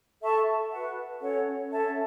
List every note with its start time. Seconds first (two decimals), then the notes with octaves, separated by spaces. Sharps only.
0.21 A4 E5 A5 C#6
0.71 F#4 B4 F#5
1.21 C#4 A4 C#5 F#5
1.70 C#4 A4 E5 A5